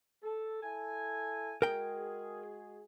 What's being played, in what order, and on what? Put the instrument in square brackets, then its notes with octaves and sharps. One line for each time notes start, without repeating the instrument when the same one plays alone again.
[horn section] A4
E4 A4 G#5
[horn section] G#3 F#4 G#4 [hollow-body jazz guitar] A#4 G5